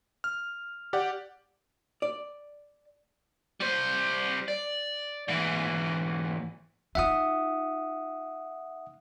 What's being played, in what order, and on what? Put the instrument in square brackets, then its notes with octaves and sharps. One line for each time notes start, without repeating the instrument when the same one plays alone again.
[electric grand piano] F6
G4 D5 F#5
[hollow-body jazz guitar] D5
[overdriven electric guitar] G3 C5
D5
G#2 E3
[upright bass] D#4 F4 [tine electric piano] E5 F#5 D#6